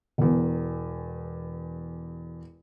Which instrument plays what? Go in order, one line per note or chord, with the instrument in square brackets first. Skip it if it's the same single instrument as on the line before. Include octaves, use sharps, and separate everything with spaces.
[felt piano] E1 E2